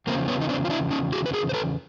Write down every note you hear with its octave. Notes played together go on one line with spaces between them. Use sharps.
E2 C#3 F3 A#3 C4
B3 C#4
D#4
C4 D4
F4
D4 E4
C#4 D#4
F#4 G#4
B4
G#4 A#4
C5
A4 B4